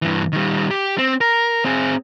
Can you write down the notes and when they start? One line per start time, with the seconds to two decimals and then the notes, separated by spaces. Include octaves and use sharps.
0.02 G2 E3
0.33 D#3 G3
0.71 G4
0.98 C4
1.21 A#4
1.65 C4 G#4